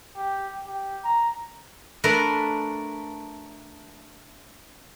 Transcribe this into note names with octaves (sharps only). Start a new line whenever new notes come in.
G4
G4
A#5
A3 D4 A#4 B4